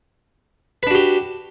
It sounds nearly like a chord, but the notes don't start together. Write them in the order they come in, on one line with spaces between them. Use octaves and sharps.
B4 D4 F#4 G4